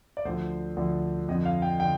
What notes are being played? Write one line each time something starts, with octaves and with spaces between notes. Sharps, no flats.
D5
D2 D3 F3 C5
D2 D3 F3
F2 D3 F3 D#5
F5
G5
D3 G5